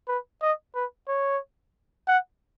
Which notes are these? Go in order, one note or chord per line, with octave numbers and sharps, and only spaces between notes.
B4
D#5
B4
C#5
F#5